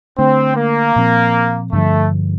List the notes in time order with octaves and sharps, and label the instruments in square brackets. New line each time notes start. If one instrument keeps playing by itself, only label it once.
[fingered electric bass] D3 A3 D4 [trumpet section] C4
[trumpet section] A#3
[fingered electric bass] A#2 F3 C4
[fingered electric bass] G2 D3 F3 [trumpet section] A3